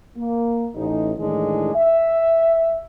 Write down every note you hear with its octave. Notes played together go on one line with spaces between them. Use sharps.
A#3
A1 D#4
A2 D#3 E3 G#3 D4 G#4
E5